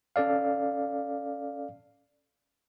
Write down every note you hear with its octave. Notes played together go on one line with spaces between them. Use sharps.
C#4 A4 D5 F5